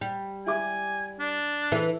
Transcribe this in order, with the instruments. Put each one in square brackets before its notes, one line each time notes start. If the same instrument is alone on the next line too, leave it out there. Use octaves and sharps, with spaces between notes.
[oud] G3
[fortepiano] E4 G4 D6 [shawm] G#5
[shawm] D4
[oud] E3 [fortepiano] A4